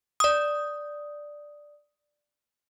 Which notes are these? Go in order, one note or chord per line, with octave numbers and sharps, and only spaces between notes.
D5 D#6